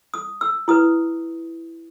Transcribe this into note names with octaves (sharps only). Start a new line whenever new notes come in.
D#6
E6
E4 B4 D#6